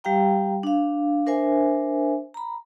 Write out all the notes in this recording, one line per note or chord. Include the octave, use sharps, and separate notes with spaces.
G3 G4 F5 G5 A#5
D4 F5
D4 A#4 C5 E5 G#5
A#5 B5